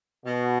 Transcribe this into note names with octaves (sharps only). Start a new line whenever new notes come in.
B2